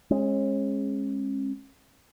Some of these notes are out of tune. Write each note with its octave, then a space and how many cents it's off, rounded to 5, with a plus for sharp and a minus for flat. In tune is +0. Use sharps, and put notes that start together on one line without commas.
G#3 +0 C#4 -35